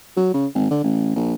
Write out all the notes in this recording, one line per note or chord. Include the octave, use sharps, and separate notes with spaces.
F#3
C#3
G#1
D3
A1
A#1